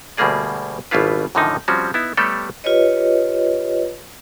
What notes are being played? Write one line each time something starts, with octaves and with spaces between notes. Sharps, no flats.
D2 B2 G3 A#3 G#4 D5
G#1 B2 G3 E4 F4 B4
F#2 A2 D3 D#3 F3 D#4
F3 G3 C4 C#4 F#4
B3 D#4 E4
G3 A3 B3 G4 A4 C#5
F4 G4 B4 C#5 D#5